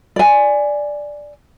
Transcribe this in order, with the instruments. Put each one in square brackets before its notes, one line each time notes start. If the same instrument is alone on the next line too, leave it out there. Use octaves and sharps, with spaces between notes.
[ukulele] D5 G#5